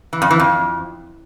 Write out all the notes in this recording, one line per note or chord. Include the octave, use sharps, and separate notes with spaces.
E3
F2
E3
F2